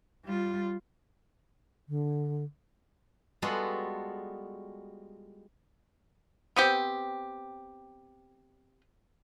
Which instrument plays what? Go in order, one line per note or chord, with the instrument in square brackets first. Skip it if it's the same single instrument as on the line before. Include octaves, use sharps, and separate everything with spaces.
[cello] G3 F4
[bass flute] D3
[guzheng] G3 G#3 B3 F4 F#4 A4
[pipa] B3 C4 G4